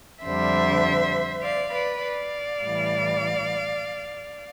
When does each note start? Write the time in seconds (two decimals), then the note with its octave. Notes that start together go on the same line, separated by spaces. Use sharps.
0.24 F2 D3 G3 C5 E5
1.42 D5 F5
1.72 B4 D5
2.02 D5 F5
2.61 A2 E3 G3